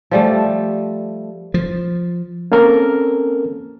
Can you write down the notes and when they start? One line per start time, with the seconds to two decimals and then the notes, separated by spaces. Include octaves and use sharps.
0.11 F3 G3 A3
1.54 F3
2.52 A#3 C4 C#4 A4 A#4